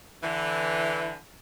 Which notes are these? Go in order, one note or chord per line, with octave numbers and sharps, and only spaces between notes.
D3 E3